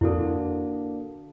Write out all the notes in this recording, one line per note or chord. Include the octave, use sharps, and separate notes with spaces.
F2 D3 A#3 D4 E4 F#4 A4